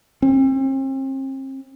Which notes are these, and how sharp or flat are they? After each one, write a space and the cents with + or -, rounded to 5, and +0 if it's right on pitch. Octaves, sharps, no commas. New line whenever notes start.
C4 +40